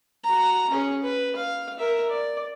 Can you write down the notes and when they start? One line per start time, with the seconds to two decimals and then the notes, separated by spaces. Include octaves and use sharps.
0.24 F#4 A#5
0.70 C#4 G#4
1.03 B4
1.36 F5
1.79 A#4 E5
2.10 D5